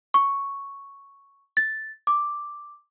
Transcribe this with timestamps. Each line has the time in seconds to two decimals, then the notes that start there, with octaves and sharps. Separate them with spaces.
0.14 C#6
1.57 A6
2.07 D6